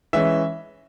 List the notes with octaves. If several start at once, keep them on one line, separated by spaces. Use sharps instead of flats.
E3 G#3 C#4 E5